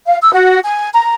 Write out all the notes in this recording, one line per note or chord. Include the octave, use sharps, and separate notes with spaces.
F5
E6
F#4
G#5
A#5